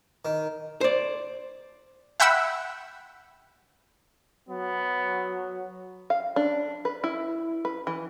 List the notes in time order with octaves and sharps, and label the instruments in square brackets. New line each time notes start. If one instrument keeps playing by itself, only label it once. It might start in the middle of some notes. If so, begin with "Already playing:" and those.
[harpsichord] D#3
[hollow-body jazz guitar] C5 D5
[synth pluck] E5 F#5 G5 B5 E6
[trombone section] F#3 [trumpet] B3
[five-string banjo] F5
D4
B4
E4
B4
E3